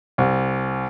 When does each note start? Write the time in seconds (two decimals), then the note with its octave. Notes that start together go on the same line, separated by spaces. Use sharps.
0.18 C2